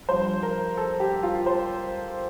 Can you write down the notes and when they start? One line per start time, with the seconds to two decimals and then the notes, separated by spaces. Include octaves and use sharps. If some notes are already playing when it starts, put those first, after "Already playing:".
0.09 G2 F3 C5
0.43 A#4
0.77 A4
1.00 G4
1.23 F4
1.46 C5